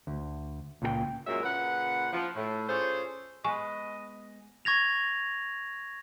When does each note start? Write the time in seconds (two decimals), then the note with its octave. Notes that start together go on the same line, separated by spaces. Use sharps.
0.07 D2
0.82 C#2 A#2 G#4 G5
1.27 F#2 A#2 F#3 G#3 A#4 E5
1.43 A#2 C#3 B4 F#5
2.13 F3
2.36 A2
2.68 C#4 F4 G#4 A4 C5
3.44 G#3 B3 B4 D#5 G#5 C#6
4.65 C#6 G#6 A#6 F7